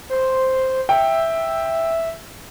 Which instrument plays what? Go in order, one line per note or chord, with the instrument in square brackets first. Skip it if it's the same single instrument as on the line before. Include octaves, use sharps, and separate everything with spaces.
[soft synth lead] C5
[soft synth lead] E5 [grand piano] G5